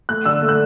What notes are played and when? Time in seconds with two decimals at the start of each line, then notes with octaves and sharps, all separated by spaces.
0.09 A3 F#6
0.25 D3 E6
0.41 A3
0.49 F#6